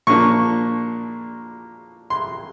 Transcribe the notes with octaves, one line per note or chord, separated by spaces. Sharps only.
A#2 F3 A#3 D4 C#6
C6